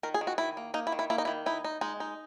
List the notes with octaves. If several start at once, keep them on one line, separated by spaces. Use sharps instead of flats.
D#3 A#4
G#4
D#3
F#4
D#3 E4
A#3
A#3 D#4
E4
D#3
E4
A#3 E4
D#4
D#3 E4
D#4 E4
D#4
G#3 D#4
D#4